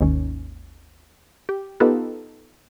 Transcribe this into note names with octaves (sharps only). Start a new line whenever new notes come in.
G#1 D#2 D#3 C#4
G4
B3 D#4 F4 G4 A4 B4